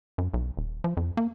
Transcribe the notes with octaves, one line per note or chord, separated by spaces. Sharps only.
F#2
B1
D#1
F3
F2
A#3